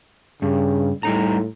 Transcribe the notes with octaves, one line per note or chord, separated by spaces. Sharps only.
G2 C#3
A2 G3 D#4 A#5